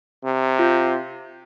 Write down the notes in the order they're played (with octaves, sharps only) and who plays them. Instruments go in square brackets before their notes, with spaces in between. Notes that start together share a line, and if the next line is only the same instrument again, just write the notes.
[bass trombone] C3
[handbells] F4